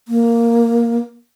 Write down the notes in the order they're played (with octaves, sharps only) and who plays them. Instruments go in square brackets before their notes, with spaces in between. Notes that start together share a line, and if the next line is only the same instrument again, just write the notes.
[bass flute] A#3